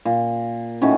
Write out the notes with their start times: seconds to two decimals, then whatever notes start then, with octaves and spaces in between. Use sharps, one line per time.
0.05 A#2
0.81 A2 D#3 C#4 F#4